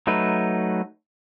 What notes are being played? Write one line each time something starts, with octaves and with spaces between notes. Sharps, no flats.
F#3 A3 D#4 B4